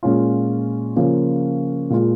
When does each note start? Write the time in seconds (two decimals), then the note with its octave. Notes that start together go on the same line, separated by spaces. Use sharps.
0.03 A#2 G#3 C#4 F4
0.96 C#3 F3 A#3 C#4 F4
1.90 A#2 G#3 F4